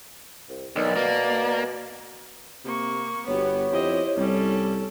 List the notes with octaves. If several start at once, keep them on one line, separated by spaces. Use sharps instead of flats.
C2
B1 D#3 D5
B2 A#3
C3 A#3 C#6
G1 B3 F#4 G4 C#5
F2 E4 G4 C5 D#5
C2 G3 C#4 A4